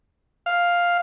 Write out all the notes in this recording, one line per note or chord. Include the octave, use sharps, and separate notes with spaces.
F5